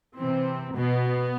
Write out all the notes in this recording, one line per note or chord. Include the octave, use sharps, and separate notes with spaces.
C3 E3 C4
B2 B3